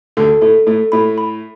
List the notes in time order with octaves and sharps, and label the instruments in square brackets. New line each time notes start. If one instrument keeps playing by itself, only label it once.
[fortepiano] D2 D3 [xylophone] A4
[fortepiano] A2 A3 [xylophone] A4
[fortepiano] A2 A3 [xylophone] A4
[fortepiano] A2 A3 [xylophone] B5
[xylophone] B5